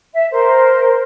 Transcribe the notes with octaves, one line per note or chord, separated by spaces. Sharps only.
E5
A#4 C5